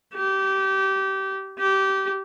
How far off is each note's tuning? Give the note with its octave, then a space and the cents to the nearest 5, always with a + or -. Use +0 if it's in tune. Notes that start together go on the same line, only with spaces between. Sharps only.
G4 -25
G4 -20